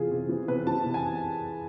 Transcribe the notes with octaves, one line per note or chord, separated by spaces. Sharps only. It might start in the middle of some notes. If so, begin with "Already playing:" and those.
Already playing: C3 E3 F4 G#4
C3
E3
C3 B4
E3 A5
C3
G#5